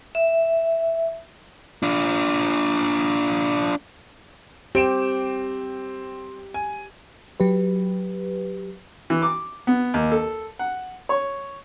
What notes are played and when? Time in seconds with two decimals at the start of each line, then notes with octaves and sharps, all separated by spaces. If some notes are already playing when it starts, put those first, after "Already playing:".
0.15 E5
1.83 D4 F4
4.75 C4 G4 D7 E7
6.54 G#5
7.40 F#3 G4 B4
9.10 E3
9.22 D6
9.67 B3
9.94 D#2
10.12 A4
10.59 F#5
11.09 C#5